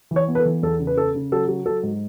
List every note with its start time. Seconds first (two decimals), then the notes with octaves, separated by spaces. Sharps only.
0.11 E3
0.16 C#5
0.28 B3
0.35 B4
0.40 A4
0.45 E3
0.63 E2 A4
0.79 C#3
0.87 B4
0.97 C#3 A4
1.15 C#3
1.32 F#3 A4
1.48 F#3
1.66 F#3 A4
1.83 G#2